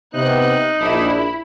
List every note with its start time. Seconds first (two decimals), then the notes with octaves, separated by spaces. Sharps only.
0.14 C3 B3 D#4 F#6
0.80 A#1 D4 E4 B5